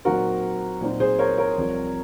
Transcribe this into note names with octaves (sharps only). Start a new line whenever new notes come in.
A#2 F#3 C4 D#4 F#4 A#4
A#2 F#3 C4 D#4
G#4 C5
A#4 C#5
A#4 C#5
C2 C3 F3